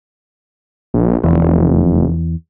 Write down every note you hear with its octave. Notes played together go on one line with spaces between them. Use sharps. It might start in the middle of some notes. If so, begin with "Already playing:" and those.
A#1
F1 E2